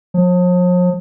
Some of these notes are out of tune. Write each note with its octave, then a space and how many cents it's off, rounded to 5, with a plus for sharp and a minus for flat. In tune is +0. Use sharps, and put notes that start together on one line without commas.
F3 +45